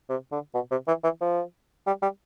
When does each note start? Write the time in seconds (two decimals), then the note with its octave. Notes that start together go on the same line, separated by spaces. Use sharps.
0.09 C3
0.32 D3
0.54 B2
0.71 C3
0.88 E3
1.04 E3
1.21 F3
1.86 G3
2.02 G3